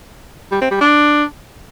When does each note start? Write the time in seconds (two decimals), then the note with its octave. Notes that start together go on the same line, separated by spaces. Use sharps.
0.52 G3
0.61 C4
0.71 G3
0.81 D4